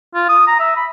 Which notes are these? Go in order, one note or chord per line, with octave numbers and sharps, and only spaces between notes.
F4
D#6
A#5
E5
B5